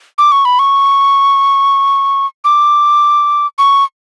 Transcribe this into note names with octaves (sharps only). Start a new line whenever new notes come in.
D6
C#6
B5
C#6
D6
C#6